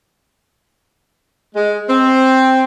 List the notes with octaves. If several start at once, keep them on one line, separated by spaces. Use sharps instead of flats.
G#3
C4